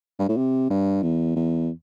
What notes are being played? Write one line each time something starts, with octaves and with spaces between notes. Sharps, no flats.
G2
A2
C3
G2
E2
E2